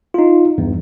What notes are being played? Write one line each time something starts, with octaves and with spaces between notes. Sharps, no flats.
D#4 F4
E2 G2